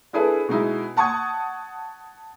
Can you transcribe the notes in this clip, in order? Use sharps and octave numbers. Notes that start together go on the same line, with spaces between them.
D4 E4 G#4 A4 B4
B2 G#3 D#4 E4
F#5 A5 C#6 D#6 G#6